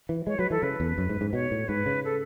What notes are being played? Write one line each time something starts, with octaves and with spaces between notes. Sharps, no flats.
E3
G#3 C#5
F#3 B4
E3 A4
C#3 B4
E2
F#2
G#2
G#2
B2 C#5
A2
G#2 B4
C#3
A4